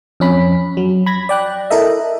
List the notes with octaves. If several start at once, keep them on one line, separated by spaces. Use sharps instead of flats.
F2 C#4 B5
F#3
B5 G#6 A#6
D5 G5 F#6
E4 A4 A#4 D#5 E5